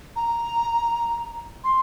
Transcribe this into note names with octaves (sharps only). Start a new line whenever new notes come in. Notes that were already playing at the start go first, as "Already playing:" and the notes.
A#5
C6